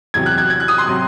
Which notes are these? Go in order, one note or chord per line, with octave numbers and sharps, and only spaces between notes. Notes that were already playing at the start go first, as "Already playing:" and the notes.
E2 C3 F#3 G#6
F#6
G#6
G#6
F#6
D#6
C6
C3 F#3